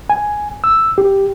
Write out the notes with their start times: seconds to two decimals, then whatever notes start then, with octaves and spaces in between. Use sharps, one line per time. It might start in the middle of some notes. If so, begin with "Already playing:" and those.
0.10 G#5
0.64 E6
0.98 G4